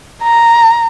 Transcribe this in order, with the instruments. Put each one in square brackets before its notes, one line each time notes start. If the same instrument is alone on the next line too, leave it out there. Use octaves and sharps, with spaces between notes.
[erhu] A#5